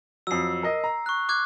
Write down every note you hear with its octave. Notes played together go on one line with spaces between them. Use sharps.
F2 F#3 E6 C7
A#4 D#5
A#5
C#6 F#6
D6 F#6 G#6